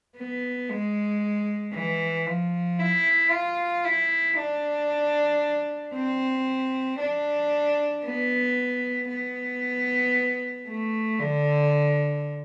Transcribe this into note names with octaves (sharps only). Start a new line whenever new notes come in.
B3
G#3
E3
F3
E4
F4
E4
D4
C4
D4
B3
B3
A3
D3